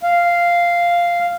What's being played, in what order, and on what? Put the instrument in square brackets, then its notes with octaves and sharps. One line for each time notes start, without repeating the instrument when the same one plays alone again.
[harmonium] F5